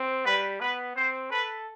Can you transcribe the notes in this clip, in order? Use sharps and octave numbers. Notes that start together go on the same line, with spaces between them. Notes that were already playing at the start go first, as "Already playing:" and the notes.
Already playing: C4
G3 B4
B3 B4
C4 C5
A4 B4